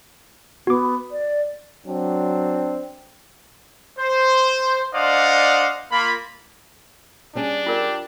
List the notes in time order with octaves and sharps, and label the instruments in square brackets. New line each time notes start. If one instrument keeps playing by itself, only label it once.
[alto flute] B3 [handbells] F#4 D6
[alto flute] D5
[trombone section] F#3 C4 D4
[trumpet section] C5
D4 C5 D5 D#5 F5 F#5
A#3 F4 B5
[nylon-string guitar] G3 C#4 G#4 [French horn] D4
[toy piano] F4 A#4 D5 [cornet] G4